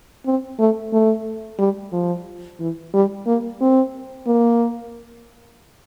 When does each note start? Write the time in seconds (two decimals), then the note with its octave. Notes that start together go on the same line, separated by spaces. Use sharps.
0.25 C4
0.59 A3
0.93 A3
1.59 G3
1.92 F3
2.59 E3
2.94 G3
3.27 A#3
3.61 C4
4.27 A#3